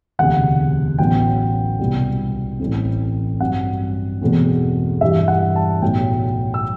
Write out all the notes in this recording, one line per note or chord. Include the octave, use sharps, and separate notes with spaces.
E1 D2 C3 F#5
A1 A2 F#3 B3 G5
C2 B2 G3 B3
A1 A2 E3 A3 C4
G2 F#3 C4 F#5
E1 E2 B2 A3 C4
G2 E3 G3 E5
F#5
A5
B1 A2 F#3 G5
E6